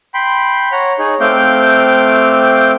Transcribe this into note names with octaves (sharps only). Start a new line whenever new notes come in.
G5 B5 C6
C#5 F#5 A#5
D#4 G#4 C#5
A3 C4 F5 G5 D6 G6